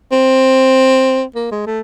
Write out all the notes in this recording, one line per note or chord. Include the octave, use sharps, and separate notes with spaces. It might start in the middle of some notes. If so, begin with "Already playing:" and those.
C4
A#3
G#3
A3